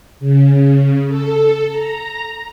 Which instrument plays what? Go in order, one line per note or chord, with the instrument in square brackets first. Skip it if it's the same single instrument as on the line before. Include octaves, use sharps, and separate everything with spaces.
[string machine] C#3
A4
A#5